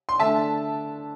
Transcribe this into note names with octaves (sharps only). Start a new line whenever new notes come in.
C6
D3 A3 D4 E5 A5